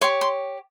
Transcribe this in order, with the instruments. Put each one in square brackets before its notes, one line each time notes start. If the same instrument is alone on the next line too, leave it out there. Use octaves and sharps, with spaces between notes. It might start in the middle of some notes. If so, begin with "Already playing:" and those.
[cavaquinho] G4 C#5 C6
C6